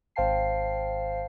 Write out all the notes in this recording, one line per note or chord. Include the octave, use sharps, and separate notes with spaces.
G#1 C5 F5 G5 A5 C7